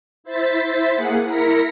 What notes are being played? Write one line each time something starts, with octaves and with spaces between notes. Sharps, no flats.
E4 C5 A6 B6
A#3 G#4 F#5
E4 A#4 A#6 B6 C#7